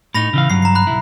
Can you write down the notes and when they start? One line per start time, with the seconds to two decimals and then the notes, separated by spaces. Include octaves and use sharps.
0.14 A2 D#4 B5 A#6 F7
0.33 C#3 E3 F5
0.50 G2 F#3 C7
0.62 A#5 C7
0.75 B5 F#6
0.87 B1 E4